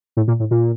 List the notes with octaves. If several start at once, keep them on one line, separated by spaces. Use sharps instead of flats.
A2
A#2
A2
A#2